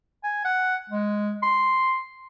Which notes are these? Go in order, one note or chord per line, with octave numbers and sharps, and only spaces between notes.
G#5
F#5
G#3
C6